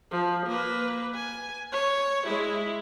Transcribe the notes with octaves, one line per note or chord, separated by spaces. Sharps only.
F3
A#3 B4
G#5
C#5
G#3 E4